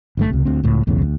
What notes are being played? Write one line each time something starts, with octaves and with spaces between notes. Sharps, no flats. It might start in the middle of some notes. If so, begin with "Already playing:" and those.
G1 G2 A3
C#2 C3
D2 C4
C#2 A2
B1 E2 A2 C#3
D2